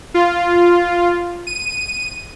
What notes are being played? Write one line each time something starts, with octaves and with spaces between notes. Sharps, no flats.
F4
D#7